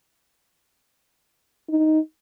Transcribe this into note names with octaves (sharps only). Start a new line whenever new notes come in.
D#4